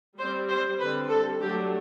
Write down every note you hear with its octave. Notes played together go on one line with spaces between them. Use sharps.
G3 C4 C5
C5
D3 G3 C4 B4
A4
F#3 A3 D4 G4